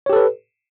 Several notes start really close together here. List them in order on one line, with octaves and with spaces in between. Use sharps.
C#5 G4 A4 B4